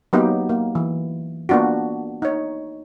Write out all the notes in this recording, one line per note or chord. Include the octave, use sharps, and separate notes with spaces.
F#3 A#3 B3 D#4 G4
A#3
E3
A#3 B3 D4 F4 F#4
D#4 C#5